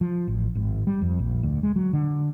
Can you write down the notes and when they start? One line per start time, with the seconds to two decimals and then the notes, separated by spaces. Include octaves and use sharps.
0.01 F3
0.28 A1
0.55 G#1
0.87 G3
1.02 F2
1.19 A#1
1.43 D2
1.63 G#3
1.76 F#3
1.93 D3